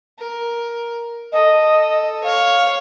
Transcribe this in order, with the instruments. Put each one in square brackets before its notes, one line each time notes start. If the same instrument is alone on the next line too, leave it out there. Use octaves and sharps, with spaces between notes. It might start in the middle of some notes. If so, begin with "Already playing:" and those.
[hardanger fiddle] A#4
[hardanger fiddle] A4 [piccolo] D#5
[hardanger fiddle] C#5 [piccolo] F5